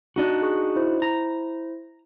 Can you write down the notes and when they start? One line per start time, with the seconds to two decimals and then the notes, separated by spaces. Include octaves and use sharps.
0.16 D4 D#4 F#4
0.42 G#4 C#6
0.76 E4 C5
1.02 A#5